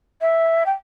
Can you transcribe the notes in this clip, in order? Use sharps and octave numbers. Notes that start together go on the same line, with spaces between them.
E5
G5